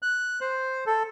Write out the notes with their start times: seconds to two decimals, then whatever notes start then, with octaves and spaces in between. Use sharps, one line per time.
0.02 F#6
0.41 C5
0.86 A4